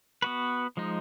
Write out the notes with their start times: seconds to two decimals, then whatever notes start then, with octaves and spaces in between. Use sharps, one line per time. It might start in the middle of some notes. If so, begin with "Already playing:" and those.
0.22 B3 F#4 B4
0.77 F3 G#3 D#4